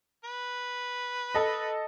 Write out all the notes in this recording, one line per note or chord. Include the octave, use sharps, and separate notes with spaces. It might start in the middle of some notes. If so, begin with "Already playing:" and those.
B4
A4 D#5